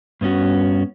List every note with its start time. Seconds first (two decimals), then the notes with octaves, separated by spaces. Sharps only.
0.21 G2 B3 C#4 F#4